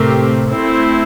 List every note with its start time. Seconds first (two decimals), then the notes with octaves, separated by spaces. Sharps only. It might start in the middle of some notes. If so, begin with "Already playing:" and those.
Already playing: A2 C3 A3 C4 G4 A#4
0.47 A3 C4 E4